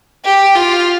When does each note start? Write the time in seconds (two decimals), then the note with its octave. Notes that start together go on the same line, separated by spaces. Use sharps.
0.25 G4
0.55 F4